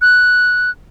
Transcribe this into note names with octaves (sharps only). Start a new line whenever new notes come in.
F#6